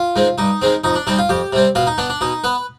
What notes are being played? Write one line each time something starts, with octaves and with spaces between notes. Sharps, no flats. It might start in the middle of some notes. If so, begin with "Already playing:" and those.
Already playing: F4
D#3 G#3 C4
G2 D#4
D#3 G#3 C4
F2 D#4
D4
C3 G3 C4 D#4
F4
F2 G4
C3 G3 C4
B2 F4
D#4
B3 D4
D4
B2 D#4
B3 B4